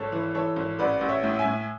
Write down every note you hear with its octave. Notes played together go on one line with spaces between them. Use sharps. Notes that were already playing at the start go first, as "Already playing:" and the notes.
Already playing: G#1 A4 C#5
E3
E3 A4 C#5
G#1
A1 B4 D5
A1
C#5 E5
A2
E5 G#5
A2